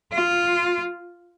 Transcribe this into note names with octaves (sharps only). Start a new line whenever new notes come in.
F4